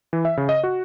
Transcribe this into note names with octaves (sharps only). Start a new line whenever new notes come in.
E3
E5
C#3
D#5
F#4